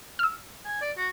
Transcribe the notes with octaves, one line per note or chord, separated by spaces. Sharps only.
E6 F6
G#5
D5
F#4